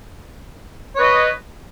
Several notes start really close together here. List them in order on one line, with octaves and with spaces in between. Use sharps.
C#5 B4 D#5